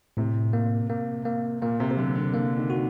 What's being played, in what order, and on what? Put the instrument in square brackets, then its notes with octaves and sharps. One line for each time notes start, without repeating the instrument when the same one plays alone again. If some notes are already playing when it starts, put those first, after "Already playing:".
[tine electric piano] A2 [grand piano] C3
[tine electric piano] A#3
A#3
A#3
[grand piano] A#2 [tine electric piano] A#3
[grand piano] C3
C3
[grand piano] D3 [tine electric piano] F#3
[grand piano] D3
[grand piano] D3 [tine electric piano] A#3
[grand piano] D#3
[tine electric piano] F#4